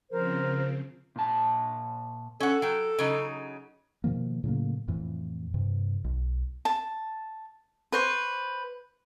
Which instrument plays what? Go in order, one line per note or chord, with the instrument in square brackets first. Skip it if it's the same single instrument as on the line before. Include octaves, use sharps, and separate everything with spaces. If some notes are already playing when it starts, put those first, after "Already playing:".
[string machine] C#3 F3 C4 [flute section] A#4 C5
[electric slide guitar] A#2 A5
[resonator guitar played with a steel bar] C#4 F#5 [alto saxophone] A4
[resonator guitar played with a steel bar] F#3 G5
C#3 F#3 D#4
[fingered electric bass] B2 D#3 F3 A#3
A2 C#3 F#3 A#3
F2 A2 E3
G2 C3
B1
[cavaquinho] A5
B4 C5 C#6